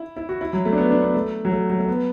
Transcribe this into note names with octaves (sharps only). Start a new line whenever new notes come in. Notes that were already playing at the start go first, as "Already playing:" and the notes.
Already playing: E4
E4
F#4
E4
F#3
A3
D4
B3
D4
B3
A3
F#3
A3
F#3
A3
B3